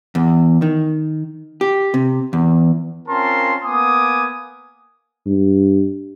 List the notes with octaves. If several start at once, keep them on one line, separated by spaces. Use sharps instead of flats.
E2
D#3
G4
C3
E2
C4 C#4 F4 A#4 A5 C6
A#3 B3 G#5 D6 D#6
G2